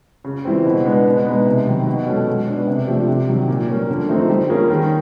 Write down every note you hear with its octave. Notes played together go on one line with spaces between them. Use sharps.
C#3
E3 G3 C4
B2
G#3 B3 D4
B2
G#3 B3 D#4
C3
D#3 F#3
B2
G#3 C#4 F#4 A4
G#3
B3 D4
C3
F3 A3 D4 G4
C3
D#3 F#3
A#2
G3 A#3 C#4
D3
F3 A3 C4 D#4
G3
A#3 C#4 F4 G#4
D#3